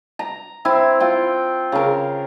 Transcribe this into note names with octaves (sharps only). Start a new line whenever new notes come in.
A#5
C4 E4
F4 G5
C#3 A#4